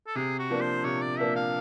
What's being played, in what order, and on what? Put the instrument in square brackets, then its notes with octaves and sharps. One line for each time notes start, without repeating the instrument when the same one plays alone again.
[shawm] A4
[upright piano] C3 [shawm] G#4
[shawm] F#4
[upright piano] F3 A#3 D4
[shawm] C5
[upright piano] C3 [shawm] C#5
[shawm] D5
[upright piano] F3 A#3 D4 [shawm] E5
[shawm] F5